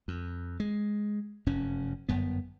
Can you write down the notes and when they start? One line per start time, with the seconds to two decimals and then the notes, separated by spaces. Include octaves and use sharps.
0.08 F2
0.60 G#3
1.46 F1 F#2 C#4
2.09 G1 F#2 B3